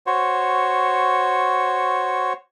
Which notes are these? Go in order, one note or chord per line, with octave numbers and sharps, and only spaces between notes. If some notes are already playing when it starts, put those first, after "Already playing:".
F#4 C5 C#5